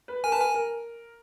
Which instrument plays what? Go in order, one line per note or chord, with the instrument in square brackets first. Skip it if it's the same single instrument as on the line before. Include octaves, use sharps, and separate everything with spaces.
[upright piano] B4
[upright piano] A#4 [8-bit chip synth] G#5
[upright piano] B4 [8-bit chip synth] A5
[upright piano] A#4 [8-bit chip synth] G#5
[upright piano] A#4